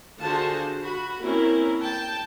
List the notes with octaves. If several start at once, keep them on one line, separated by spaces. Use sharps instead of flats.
D3 F4 F#4 G#4 C5 A5
F#4 B5
A#3 C4 C#4 E4 A#4
G5 A5